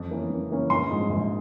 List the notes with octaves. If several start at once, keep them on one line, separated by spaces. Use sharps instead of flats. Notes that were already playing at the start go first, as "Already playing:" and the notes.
Already playing: F2
E3 A#3 C#4
F2
E3 A#3 C#4
A#1 C6
G#2 F3 C4
A#1